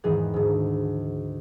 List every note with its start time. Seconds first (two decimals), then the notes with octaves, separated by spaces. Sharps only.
0.04 E2 G#2 D#3 E3 G#4
0.34 D2 G#2